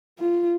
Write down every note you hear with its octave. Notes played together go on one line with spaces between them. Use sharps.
F4